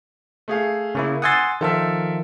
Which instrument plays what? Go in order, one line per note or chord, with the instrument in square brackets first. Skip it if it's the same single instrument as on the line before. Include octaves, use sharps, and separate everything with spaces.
[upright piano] A3 G#4 F5
[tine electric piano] C#3 A#3 E4
[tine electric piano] F#5 G#5 C6 [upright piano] D#6 E6 A6
[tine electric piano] D#3 F3 F4 [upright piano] A4 A#4 E5